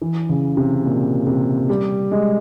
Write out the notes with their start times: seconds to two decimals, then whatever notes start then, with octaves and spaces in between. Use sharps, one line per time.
0.01 E3
0.29 C#3
0.57 C3
0.85 A#2
1.27 C3
1.69 G3
2.11 G#3